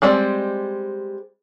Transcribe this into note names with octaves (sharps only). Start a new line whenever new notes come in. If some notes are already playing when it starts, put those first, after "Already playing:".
G3 G#3 C4 D5